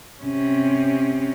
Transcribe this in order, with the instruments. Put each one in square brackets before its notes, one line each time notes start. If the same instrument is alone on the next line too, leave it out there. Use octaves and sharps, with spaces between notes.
[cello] C3 C#4